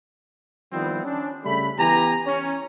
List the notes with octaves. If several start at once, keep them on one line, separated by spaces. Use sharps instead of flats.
D#3 F3 G3 B3 C4 E4
C#4 D4
C#3 G3 A3 B5
E3 B3 G4 G#5 A#5
C#4